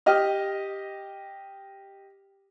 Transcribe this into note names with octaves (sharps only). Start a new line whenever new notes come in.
G4 D#5 F6